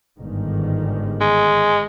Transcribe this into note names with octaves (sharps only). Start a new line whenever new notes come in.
G1 G#2 D#3
G#3